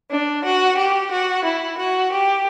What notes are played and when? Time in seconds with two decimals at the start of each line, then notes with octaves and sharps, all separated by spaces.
0.09 D4
0.43 F#4
0.77 G4
1.11 F#4
1.44 E4
1.78 F#4
2.11 G4